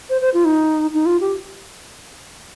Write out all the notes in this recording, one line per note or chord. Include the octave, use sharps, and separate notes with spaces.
C5
C5
F4
D#4
D#4
F4
G4